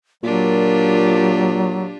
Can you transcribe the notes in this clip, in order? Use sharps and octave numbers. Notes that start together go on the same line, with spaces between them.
A#2 F#3 D4 F4 G4 A#4